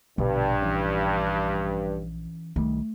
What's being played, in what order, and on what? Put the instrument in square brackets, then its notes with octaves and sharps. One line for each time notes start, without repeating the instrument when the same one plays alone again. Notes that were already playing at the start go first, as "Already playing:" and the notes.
[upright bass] A#1 [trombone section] G2 [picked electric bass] B2 D3 G3
[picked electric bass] E3 C#4
[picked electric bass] C2 D#3 G3 [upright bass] A3